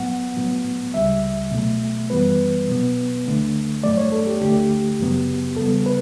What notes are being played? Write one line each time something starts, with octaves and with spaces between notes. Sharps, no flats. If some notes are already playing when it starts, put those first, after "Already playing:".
Already playing: A2 F#3 B3 F#5
A2 F#3 B3
C#2 C#3 G3 E5
B2 F#3 A3
F#2 E3 G3 B3 B4
B2 F#3 B3
D2 D3 A3
G2 F#3 A3 D5
C#5
A4
G4
D2 D3 A3 G4
F#2 C#3 F#3 B3
E2 C#3 G3 B3 A4
B4